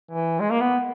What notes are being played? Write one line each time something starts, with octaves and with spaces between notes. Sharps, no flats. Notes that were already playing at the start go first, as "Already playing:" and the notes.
E3
G#3
A#3
B3